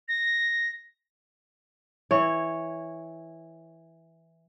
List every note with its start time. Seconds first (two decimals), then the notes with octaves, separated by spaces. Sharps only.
0.08 A#6
2.11 E3 C#5